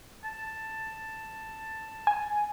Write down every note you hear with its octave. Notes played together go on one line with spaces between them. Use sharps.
A5
G#5